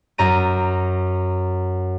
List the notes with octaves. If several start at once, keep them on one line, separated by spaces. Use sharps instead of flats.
F#2 A#5 D#7